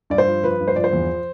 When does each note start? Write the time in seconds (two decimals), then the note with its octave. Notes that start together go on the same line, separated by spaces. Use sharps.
0.10 G2 D5
0.18 C5
0.27 F3
0.43 F3 B4
0.60 G2
0.68 C5
0.76 F3 D5
0.84 C5
0.93 E2